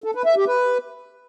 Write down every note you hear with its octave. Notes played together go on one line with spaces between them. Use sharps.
A4
B4
E5
G4
B4